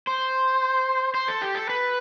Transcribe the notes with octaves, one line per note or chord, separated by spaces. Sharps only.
C5
C5
A4
G4
A4
B4